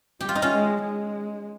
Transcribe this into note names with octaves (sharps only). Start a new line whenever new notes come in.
G3 G4
F4
D#4
C#4 F4
G#3
G#3